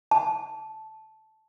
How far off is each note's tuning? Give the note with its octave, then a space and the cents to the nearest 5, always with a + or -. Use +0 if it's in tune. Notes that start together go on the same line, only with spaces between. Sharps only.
A5 -10